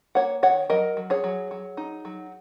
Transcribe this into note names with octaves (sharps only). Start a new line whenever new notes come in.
A#3 C#5 F#5
D#3 C#5 F#5
F#3 A#4 D#5
F#3
G#4 C#5
F#3
F#3
D#4
F#3